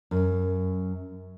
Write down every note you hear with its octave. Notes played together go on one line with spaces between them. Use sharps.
F#2